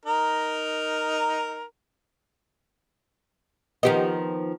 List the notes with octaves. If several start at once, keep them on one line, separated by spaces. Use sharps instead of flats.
D#4 A#4
D#3 F3 B3 G4 D#5